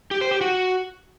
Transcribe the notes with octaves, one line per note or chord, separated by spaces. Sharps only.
G4
C5
G4
F#4